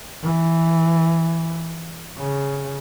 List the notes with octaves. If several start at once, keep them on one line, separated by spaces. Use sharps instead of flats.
E3
C#3